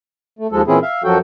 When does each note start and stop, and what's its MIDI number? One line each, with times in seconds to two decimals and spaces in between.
0.39 0.47 57
0.52 0.61 39
0.52 0.61 53
0.52 0.61 56
0.52 0.61 69
0.67 0.79 46
0.67 0.79 52
0.67 0.79 60
0.67 0.79 61
0.67 0.79 64
0.67 0.79 68
0.82 1.02 76
0.82 1.02 77
1.04 1.18 42
1.04 1.18 53
1.04 1.18 54
1.04 1.18 66
1.04 1.18 69
1.04 1.18 79